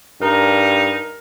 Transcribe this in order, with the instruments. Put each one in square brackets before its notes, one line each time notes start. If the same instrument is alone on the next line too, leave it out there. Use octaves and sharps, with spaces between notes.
[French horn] G2 [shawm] D#4 [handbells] A#4 A#5